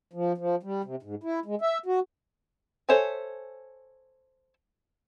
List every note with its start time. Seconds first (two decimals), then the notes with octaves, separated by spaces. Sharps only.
0.13 F3
0.38 F3
0.63 G3
0.84 C3
1.03 G#2
1.23 E4
1.46 G#3
1.61 E5
1.86 F#4
2.89 A4 C5 C#5 E5 G#5